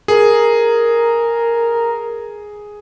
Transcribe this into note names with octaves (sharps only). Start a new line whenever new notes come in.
G#4 A#4